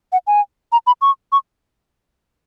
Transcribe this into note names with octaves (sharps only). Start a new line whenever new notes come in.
F#5
G#5
A#5
B5
C#6
C#6